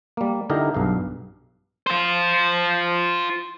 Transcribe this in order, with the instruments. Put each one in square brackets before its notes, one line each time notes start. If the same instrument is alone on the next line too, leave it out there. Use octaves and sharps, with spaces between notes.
[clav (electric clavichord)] G3 A#3
D3 D#4 E4 G4 A#4
B1 G2 F5
[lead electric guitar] F4 C5